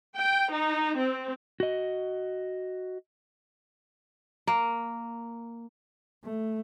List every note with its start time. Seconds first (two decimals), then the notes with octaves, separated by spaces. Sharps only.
0.18 G5
0.52 D#4
0.97 C4
1.60 F#4 D#5
4.47 A#3
6.24 A3